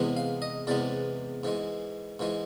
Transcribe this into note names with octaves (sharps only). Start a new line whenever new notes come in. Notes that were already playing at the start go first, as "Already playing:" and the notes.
Already playing: E2 C3 E3 G#3 B3
F5
D#5
E2 C3 E3 G#3 B3 D5
G#2 E3 G#3
G#2 E3 G#3